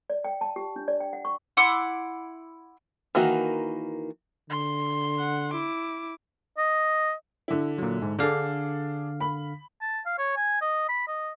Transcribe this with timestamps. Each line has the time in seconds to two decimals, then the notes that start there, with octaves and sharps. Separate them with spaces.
0.10 D5
0.24 G5
0.41 A5
0.56 G4
0.76 D4
0.88 D5
1.00 G5
1.13 F#5
1.25 C#6
1.57 E4 F#5 C6 D6
3.15 D#3 E3 A#3 F#4
4.50 D3 C6
5.19 F#5
5.51 E4 D6
6.58 D#5
7.48 D3 E4
7.78 A#2 F#3
8.02 G#2
8.19 D3 D4 G#4 A4 F5
9.20 B5
9.81 A5
10.06 F5
10.18 C#5
10.37 G#5
10.61 D#5
10.89 B5
11.07 D#5